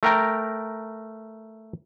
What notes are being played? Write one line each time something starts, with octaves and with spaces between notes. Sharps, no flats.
A3 A#4 G5 A#5